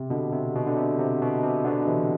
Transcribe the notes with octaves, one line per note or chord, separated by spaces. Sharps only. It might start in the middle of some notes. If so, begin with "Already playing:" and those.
Already playing: C3
B2 D3
C3
B2
D3
C3
C3
B2
C3
B2 D3
C3 E3